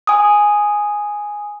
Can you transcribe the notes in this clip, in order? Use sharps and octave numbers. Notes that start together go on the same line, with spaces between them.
G#5 D#6